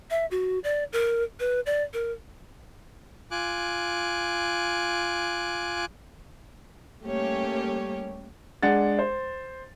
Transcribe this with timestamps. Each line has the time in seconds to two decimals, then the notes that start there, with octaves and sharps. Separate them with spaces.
0.10 E5
0.31 F#4
0.64 D5
0.93 A#4
1.40 B4
1.66 D5
1.94 A#4
3.31 F4 G#5 D6 F#6
7.04 G3 A3 A#3 C#4 G4 C#5
8.63 G#3 D4 F#5 A6
8.99 C5